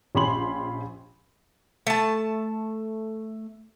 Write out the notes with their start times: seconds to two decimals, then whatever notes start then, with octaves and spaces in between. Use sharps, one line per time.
0.15 A#1 C#4 G4 B5 C6 F#7
1.87 A3 A5